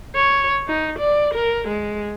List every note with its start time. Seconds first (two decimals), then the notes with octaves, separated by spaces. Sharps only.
0.15 C#5
0.68 D#4
0.99 D5
1.34 A#4
1.68 G#3